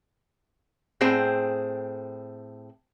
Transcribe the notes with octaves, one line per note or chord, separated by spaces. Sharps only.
A2 C4 G#4 C5 G5